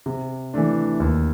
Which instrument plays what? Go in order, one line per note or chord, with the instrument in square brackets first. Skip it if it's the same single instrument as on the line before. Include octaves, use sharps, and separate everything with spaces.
[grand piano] C3
E3 A3 D4
D#2